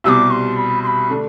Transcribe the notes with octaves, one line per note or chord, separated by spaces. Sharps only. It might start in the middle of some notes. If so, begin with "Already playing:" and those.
C2 B2 G3 D6 E6
C6
B5
C6
B5
D3 A3 D4